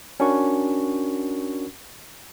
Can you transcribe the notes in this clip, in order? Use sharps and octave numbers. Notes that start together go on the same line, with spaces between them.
C#4 D4 F#4 A#4 C#6